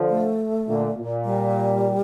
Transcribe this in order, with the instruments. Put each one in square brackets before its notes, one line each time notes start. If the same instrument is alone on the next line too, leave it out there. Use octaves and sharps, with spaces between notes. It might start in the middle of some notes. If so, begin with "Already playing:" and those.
Already playing: [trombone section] D3 F3
[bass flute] A3
[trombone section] A#2 D3
A#2
[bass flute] G3